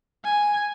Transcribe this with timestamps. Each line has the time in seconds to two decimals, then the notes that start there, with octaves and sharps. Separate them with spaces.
0.24 G#5